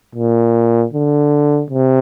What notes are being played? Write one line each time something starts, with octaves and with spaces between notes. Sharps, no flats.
A#2
D3
C3